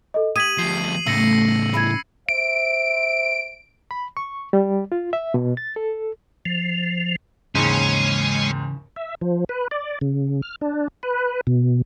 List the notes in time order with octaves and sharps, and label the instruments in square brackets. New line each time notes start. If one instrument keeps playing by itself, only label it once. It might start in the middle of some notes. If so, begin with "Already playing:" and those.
[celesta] A4 D#5
[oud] G4 [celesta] D#6 G#6 B6 [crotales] D#7 F#7
[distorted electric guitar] D2 F3 [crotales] C7
[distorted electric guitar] A2 C#3 [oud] A3 [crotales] E6 A#6 C#7
[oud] E4 G#4 [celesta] B5 G#6
[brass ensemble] C5 E5 [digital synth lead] D7
[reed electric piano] B5
C#6
G3
F4
E5
B2
A6
A4
[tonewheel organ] F3
[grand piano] D#2 G#2 [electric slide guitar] C#3 E3 [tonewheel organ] G#3 [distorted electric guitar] C#4
[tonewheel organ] E5
F3
B4
D5
C#3
F6
D4
B4
B2